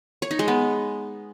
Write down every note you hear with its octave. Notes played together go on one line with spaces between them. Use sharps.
C#5
D#4
G#3
B3